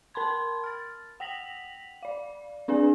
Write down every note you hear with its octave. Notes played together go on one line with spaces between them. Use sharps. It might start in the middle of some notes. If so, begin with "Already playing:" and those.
A#4 A5 B5 C6 G#6
F6 A6
F#5 G5 A#6 B6 F7 F#7
D5 F5
C4 D4 G#4 D5 G#5